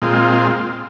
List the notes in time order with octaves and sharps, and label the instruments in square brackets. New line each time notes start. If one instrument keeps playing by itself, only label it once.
[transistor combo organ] A#2 G#3 C4 F4